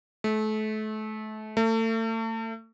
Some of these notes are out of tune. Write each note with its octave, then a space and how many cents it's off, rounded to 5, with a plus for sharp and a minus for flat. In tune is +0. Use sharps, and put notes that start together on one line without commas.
A3 -30
A3 +35